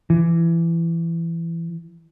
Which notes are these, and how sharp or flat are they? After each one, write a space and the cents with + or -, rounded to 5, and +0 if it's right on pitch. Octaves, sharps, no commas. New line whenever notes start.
E3 +20